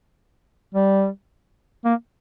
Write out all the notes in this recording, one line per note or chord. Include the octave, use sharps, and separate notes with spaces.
G3
A#3